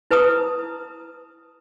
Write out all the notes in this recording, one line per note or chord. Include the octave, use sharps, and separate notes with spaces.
E4 B4 A5 A#5 D#6